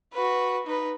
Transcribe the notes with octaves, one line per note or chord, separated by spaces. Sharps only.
F#4 B4
D#4 B4